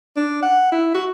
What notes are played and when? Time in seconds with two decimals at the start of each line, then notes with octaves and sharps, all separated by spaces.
0.17 D4
0.43 F#5
0.72 E4
0.95 F#4